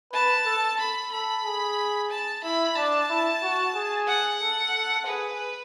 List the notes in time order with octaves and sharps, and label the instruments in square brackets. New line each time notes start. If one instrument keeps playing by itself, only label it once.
[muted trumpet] B4 [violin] A5
[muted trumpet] A4
[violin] B5
[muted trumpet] A4 [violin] B5
[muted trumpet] G#4
[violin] A5
[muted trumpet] E4 [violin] B5
[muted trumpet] D4 [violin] A5
[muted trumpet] E4
F#4
G#4
[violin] F#5
[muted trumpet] A4
A4
[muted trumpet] G#4 [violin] B4